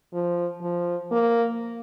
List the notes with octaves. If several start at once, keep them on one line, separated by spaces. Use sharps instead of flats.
F3
F3
A#3